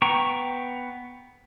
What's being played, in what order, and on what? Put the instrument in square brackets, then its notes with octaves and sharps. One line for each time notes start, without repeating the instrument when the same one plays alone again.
[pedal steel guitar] B3 G5 A#5 C#6